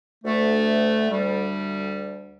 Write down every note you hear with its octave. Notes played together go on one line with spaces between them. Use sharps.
D2 A3
D2 G3